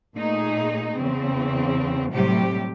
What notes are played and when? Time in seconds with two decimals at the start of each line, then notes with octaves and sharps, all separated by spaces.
0.14 A#2 A3 D#4 G#4
0.96 E2 C#3 C4
2.12 A2 C3 F#3 G3 G4